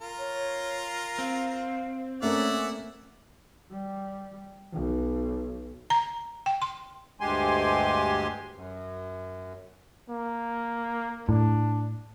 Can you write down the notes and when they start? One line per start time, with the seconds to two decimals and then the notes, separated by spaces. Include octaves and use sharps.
0.01 F4 A#4
0.19 C#5
1.18 C4 F5
2.22 A3 A#3 C#4 A#4 D5 E5 F#5
3.71 G3
4.73 B1
5.90 A#5
6.46 G5
6.62 C6
7.20 D2 G2 G#3 G4 G#5 C6
8.55 F#2
10.09 A#3
11.29 A2 D4